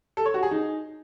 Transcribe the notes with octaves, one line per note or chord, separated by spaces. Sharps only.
A4
C#5
F#4
G#4
D#4